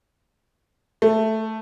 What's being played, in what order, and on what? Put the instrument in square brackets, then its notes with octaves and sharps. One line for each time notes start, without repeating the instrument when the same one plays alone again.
[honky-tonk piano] A3